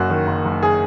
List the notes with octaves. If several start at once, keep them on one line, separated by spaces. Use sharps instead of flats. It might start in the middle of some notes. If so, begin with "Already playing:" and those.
Already playing: F#1 F#2 F#4
D#3
F#1
F#1
G#4